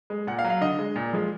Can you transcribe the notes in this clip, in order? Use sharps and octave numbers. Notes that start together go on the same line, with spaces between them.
G#3
A#2 F#5
F5
F#3
F5
D3 D#5
G#3
A#2
F3 G#3